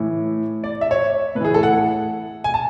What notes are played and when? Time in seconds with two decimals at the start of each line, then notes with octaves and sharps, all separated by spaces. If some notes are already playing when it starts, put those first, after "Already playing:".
Already playing: A2 E3
0.64 D5
0.81 E5
0.91 C#5
1.35 A2 B4
1.41 E3 G#4
1.54 A4
1.63 F#5
2.44 G#5
2.54 A5